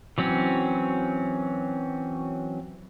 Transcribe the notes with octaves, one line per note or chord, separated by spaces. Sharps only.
E3 F#3 C4 C#4